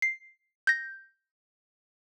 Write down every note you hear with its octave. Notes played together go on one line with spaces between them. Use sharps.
C7
G6 A#6